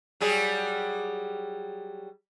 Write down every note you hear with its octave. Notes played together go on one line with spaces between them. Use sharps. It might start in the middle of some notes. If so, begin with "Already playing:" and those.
F#3 G3 G#4